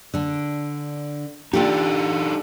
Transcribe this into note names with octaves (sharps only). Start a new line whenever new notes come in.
D3 D4
D4 D#4 F4 G4 A4 D5